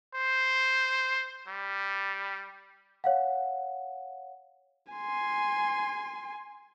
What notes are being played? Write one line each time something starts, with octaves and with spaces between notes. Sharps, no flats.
C5
G3
C#5 F5 F#5
G#5 C6